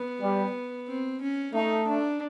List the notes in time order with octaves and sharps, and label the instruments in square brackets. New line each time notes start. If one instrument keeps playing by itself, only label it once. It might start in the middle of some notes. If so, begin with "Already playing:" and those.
Already playing: [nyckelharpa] B3
[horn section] G3
[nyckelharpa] C4
C#4
[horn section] A3 [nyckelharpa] D#4
[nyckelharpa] D4